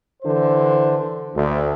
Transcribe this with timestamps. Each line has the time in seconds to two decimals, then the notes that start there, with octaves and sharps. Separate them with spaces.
0.22 D3 E3 C5
1.35 D2